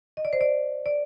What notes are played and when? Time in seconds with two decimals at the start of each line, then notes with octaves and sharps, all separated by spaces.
0.17 D#5
0.25 D5
0.33 C5
0.41 D5
0.86 D5